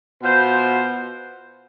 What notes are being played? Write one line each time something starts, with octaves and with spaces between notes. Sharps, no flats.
B2 B3 F4 C5